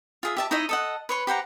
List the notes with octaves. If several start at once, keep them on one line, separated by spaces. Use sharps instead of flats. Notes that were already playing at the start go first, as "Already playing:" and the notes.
F4 G#4 E5
G4 E5 A5
D#4 E4 C#5 D#5
A4 D#5 F#5
B4 C#5 C6
G4 C5 F#5 A#5